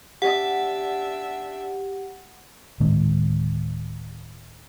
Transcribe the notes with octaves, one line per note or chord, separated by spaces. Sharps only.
D4 G4 E5 F#5
D1 D#3 G#3 C4